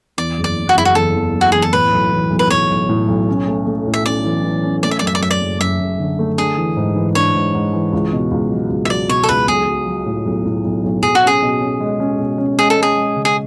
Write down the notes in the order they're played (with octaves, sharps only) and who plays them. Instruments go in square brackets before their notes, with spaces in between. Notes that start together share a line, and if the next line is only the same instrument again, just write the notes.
[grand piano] E2 [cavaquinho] D5
[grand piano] F#1
[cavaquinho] D5
[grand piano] F#1
[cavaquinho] F#4
[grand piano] F#1 [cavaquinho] E4
[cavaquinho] F#4
[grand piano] E2 [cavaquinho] A4
[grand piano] E2
F#1
[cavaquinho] F#4
[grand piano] E2 [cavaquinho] G#4
[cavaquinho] A4
[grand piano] A2 [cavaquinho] B4
[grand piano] B1
E3
B1
[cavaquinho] B4
[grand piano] B1 [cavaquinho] C#5
[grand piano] B1
A2
B1
C#4
A3
A3
A2
[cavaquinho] E5
[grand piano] C#4 [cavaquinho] D5
[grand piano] E3
E3
C#4
[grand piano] A3 [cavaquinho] D5
[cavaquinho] E5
D5
[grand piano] F#2
[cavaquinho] E5
D5
[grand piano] F#2 [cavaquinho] E5
[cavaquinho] D5
[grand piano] F#1
[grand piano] F#2 [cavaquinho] E5
[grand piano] F#1
D3
A3
[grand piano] D4 [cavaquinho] G#4
[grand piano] E3
G#2
E3
[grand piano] D4 [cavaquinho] C#5
[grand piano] G#2
G#2
E3
C#2
B2
C#2
F#3
C#2
[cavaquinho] E5
[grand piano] F#3 [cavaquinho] D5
[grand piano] B2 [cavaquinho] C#5
[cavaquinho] A4
[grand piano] C#2 [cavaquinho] B4
[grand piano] B1 [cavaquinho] G#4
[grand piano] F#3
F#3
A2
B1
A2
B1
B1
[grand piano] B1 [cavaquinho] G#4
[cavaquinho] F#4
[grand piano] C#4 [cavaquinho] G#4
[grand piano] B2
C#4
G#3
C#4
B2
C#4
[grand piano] G#3 [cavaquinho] G#4
[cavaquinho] A4
[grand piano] G#3
[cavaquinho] G#4
[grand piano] G#3
C#3
[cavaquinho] G#4